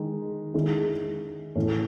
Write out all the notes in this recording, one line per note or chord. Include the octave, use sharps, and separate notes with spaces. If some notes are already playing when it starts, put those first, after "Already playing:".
Already playing: D#3 G#3 D#4
D#3 G#3 C#4 E4 G#4
A2 E3 A3 C#4